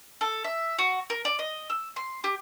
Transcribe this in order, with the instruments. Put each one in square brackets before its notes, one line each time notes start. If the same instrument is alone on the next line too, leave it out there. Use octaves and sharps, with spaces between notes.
[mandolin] A4
E5
F#4
A#4
D5
D#5
E6
C6
G4